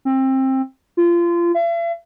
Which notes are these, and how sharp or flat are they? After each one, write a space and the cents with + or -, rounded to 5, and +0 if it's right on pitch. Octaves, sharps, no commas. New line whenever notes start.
C4 +20
F4 -25
E5 +45